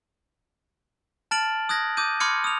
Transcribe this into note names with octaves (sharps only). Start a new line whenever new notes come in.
A5 F6 A6 D7 F#7
D#6 F#6 G#6 A#6
D6 D#6 G6 D#7
B5 C6 D6 F6 G#6 C#7
D#6 F7